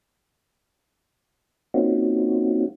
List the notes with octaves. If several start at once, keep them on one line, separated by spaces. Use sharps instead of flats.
A#3 C4 C#4 D#4 F4 F#4